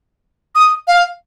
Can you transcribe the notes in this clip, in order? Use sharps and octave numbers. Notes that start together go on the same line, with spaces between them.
D#6
F5